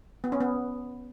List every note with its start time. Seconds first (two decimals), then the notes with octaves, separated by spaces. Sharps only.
0.24 B3
0.32 C#4
0.41 B3